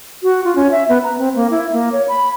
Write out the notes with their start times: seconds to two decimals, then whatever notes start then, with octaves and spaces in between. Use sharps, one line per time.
0.23 F#4
0.44 F4
0.56 C#4
0.71 E5
0.89 B3
1.04 A#5
1.18 C4
1.36 A#3
1.50 E4
1.73 A#3
1.92 C#5
2.08 B5